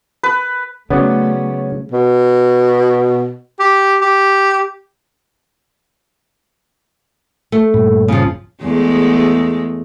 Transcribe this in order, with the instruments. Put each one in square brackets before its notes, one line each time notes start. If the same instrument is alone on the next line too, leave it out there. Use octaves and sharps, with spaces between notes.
[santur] B4
[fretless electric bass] C#3 F#3 [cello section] A3 [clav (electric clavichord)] B3 B4 D5 [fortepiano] C#4
[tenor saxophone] B2
G4
G4
[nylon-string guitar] A3
[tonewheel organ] G2 A#2
[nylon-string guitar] C#3 F3
[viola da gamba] E2 G#3 A3